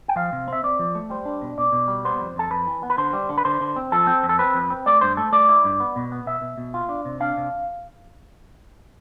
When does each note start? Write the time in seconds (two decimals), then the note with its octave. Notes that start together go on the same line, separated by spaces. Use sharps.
0.08 G5
0.16 F3 F5
0.33 C3
0.48 C4 E5
0.63 C4 D5
0.79 F3
0.95 A3
1.10 G3 C5
1.25 D4
1.42 B2
1.58 B2 D5
1.72 B2
1.88 G3
2.05 B3 C5
2.20 F2
2.36 F2 A4
2.51 F2 B4
2.67 E3
2.83 B3
2.90 B4
2.97 D3 C5
3.13 G3
3.29 D3
3.38 B4
3.45 D3 C5
3.61 D3
3.76 C4
3.92 F3 A4
4.07 C4
4.23 F2
4.29 A4
4.39 C4 B4
4.54 F2
4.70 C4
4.86 A3 D5
5.01 G2 C5
5.17 A3 A4
5.32 A3 D5
5.49 E4
5.64 G2
5.80 B3
5.96 B2
6.12 B3
6.26 B2 E5
6.42 B2
6.58 B2
6.74 F4
6.89 D4
7.05 C3
7.20 D4 F5
7.37 C3